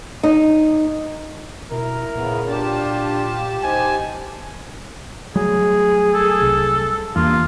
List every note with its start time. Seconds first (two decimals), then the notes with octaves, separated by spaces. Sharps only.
0.23 D#4
1.71 B2 E4 A#4
2.15 A#2 C#3 B3
2.48 D4 F4 G4 A5
3.63 D#4 C5 G#5
5.36 F#3 G3 A3 G#4
6.14 A4
6.42 C2
7.16 E2 G2 A#3 F4